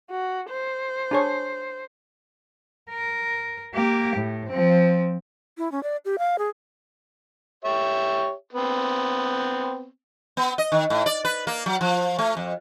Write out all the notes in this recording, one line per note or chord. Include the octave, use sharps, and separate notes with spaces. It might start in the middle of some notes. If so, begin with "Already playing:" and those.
F#4
C5
D4 G#4 C#5
A#4
A#3 G4
A2
F3 C4
E4
C#4
D5
G4
F5
G#4
G4 C#5 E5
B3 C4
B3
D#5
D#3
A2
D5
B4
A#3
F#3
F3
A3
F2